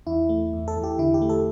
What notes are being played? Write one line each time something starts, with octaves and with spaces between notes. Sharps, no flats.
E2 E4
A3
E2
A4
E2
G4
D3 E4
G4
A3
A4